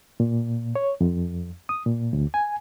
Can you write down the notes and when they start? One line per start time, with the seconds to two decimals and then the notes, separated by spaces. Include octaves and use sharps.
0.20 A#2
0.75 C#5
1.01 F2
1.69 D#6
1.86 A#2
2.13 D2
2.34 G#5